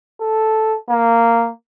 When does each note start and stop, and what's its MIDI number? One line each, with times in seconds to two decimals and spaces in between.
0.21 0.76 69
0.90 1.50 58